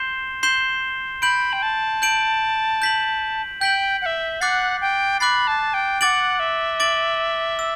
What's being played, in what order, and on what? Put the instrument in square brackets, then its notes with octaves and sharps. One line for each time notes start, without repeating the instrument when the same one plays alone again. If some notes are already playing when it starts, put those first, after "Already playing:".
Already playing: [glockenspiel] C6 G6 C7 E7 G7
C6 G6 C7 E7 G7
[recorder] B5 [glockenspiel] G6 D7 F#7
[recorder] G5
A5
[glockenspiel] G6 D7 F#7
G6 B6 F#7
[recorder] G5 [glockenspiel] G6 B6 F#7
[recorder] F#5
E5
[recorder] F#5 [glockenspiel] D6 F#6 A6 C7
[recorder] G5
[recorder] B5 [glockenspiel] D6 F#6 A6 C7
[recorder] A5
G5
[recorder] F#5 G5 [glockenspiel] D6 A6 D7 F#7
[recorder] E5
[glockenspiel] D6 A6 D7 F#7
E6